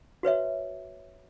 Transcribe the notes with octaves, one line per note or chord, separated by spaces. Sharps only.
F#4 B4 C#5 E5